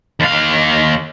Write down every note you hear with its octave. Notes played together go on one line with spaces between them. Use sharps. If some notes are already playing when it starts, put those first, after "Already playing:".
D#2 F5